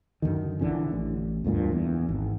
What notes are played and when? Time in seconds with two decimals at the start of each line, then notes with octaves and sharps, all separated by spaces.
0.22 F#2 B2 D3 D#3
0.61 A#1 D3 E3 C#4
0.92 A1
1.44 E1 D2 G2 A#2
1.72 E2
2.09 G#1